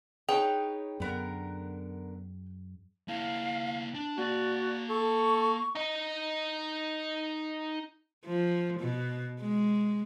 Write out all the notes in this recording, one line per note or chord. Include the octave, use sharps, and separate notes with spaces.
D#4 G#4 B4 C#5 G5
F#2 D3 B3 A#4
A#3 E4 F5
D4
A#3 F#4 D5 A5
A4 C#6
D#4 D#5
F3
B2
G#3